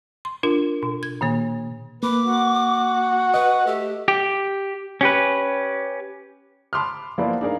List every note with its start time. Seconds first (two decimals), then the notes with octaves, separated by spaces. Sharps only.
0.25 C6
0.43 D4 F4 A#4
0.83 B2
1.03 G#6
1.21 A#2 D#3 A#3
2.03 A#3 B4 D6
2.24 F#4
3.34 B4 D#5
3.67 A3 G4
4.08 G4
5.01 C#4 G4 B4
6.73 A5 B5 C6 D6 D#6 F6
7.18 F3 A#3 B3 E4 B4 D5
7.41 D4 D#4 G#4 A#4 F5